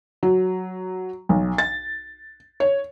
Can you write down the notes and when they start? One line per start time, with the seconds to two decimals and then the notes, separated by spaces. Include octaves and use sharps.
0.23 F#3
1.29 B1
1.58 A6
2.60 C#5